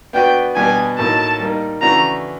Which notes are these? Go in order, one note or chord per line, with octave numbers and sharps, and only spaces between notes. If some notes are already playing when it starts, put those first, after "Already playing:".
B3 D4 F#4 B4 G5
B2 G3 B3 D4 G4 G#5
A2 F#3 A#3 D#4 A5
G3 A#3 D#4
C#3 E3 A3 D4 F#4 A#5